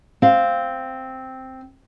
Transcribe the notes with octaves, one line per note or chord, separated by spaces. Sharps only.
C4 F5